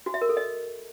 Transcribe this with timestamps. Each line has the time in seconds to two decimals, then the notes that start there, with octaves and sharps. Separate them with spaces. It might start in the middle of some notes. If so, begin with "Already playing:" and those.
0.06 F#4
0.14 E5
0.22 A#4
0.29 A4
0.37 D#5